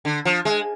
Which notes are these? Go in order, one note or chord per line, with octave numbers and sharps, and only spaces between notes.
D3
F3
G#3